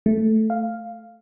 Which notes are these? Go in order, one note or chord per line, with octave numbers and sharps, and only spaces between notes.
A3
F5